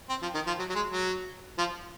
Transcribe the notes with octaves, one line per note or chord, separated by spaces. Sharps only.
C4
F3
D#3
F3
F#3
F#3
G#3
F#3
F3